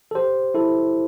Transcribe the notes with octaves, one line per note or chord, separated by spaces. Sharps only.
A4
G4 C5
E4 A4